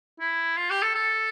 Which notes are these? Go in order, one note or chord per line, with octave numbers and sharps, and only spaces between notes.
E4
F4
G4
A4
A4